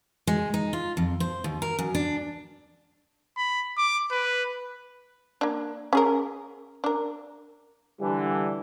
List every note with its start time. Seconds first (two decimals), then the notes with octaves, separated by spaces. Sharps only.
0.27 G#3
0.54 D#4
0.73 F4
0.97 F2
1.20 C5
1.44 D#2
1.62 A#4
1.79 F#2
1.95 D4
3.37 B5
3.78 D6
4.11 B4
5.41 A#3 D4
5.93 C#4 G#4 A#4
6.84 D4 A#4
8.00 D3 E3 G3